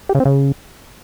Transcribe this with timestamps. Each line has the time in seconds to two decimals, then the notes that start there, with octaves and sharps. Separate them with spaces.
0.09 G4
0.15 C#3
0.20 C4
0.25 C#3